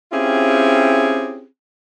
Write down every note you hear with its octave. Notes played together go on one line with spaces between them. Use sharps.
C4 C#4 E4 F4 G4 G#4